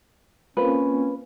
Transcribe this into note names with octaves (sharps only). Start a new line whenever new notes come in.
A#3 C4 C#4 F4 B4